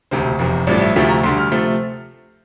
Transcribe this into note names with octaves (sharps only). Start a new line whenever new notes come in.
E1 D2 C3 C5
F1 E2 C3
A1 G2 F3 A3 D5
E5
D2 C3 F3 A3 E5
A#5
D2 D3 G3 C6
F6
C3 F3 A3